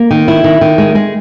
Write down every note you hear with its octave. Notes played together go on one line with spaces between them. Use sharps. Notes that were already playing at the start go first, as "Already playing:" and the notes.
Already playing: A#3
D#3
E4
D#3
D#3
G#3
G#3